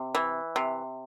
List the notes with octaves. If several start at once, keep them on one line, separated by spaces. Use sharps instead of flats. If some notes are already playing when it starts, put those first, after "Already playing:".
Already playing: C3
E3
C3